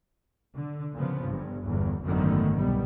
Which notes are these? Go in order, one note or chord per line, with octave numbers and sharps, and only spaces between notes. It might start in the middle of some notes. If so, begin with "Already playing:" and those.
D3
A#2 C#3 F3 B3
G1 G2
G1 E2
G#1 F#2 D3 D#3 A3 B3
C2 B2 G3 B3